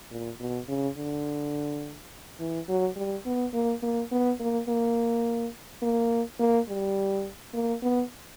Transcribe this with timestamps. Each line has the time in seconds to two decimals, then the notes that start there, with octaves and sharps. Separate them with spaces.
0.11 A#2
0.40 B2
0.68 C#3
0.97 D3
2.40 E3
2.68 F#3
2.96 G3
3.26 B3
3.54 A#3
3.83 A#3
4.12 B3
4.40 A#3
4.68 A#3
5.82 A#3
6.39 A#3
6.68 G3
7.54 A#3
7.83 B3